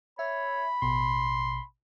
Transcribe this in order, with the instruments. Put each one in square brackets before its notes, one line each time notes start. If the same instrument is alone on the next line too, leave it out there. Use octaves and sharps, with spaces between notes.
[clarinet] C#5 [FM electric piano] E5 [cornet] B5
[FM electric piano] A1 B2 [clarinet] C6